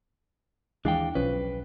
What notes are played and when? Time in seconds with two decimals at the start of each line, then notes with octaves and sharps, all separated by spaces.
0.85 D#2 E3 G#3 D4 F5 G5
1.15 B1 F3 C#4 B4